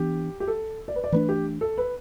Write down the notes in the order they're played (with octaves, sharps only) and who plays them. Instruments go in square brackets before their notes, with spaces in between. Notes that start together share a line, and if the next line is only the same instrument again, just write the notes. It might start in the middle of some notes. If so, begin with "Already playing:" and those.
Already playing: [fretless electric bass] E3 B3 D4 [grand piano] G4
[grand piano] G4
A4
D5
B4
D5
[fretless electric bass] E3 A3 D4 [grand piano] B4
[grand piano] G4
A4
B4